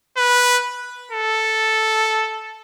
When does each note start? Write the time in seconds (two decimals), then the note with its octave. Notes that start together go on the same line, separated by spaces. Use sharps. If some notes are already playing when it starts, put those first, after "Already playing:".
0.17 B4
1.11 A4